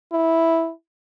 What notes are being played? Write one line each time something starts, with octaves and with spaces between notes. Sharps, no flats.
E4